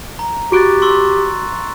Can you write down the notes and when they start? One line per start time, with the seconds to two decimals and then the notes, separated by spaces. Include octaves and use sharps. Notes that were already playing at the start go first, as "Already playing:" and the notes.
0.19 A#5
0.52 F#4 G4 C#6 F#6 A6 D7
0.82 C6 C#6 E6